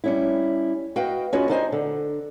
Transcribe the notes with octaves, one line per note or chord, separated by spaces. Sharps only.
G3 C#4 E4
F#4 B4 D#5 F5 G5
C#4 F4 F#4 B4 C#5 D#5
D4 D#4 C5 D#5 G#5
D3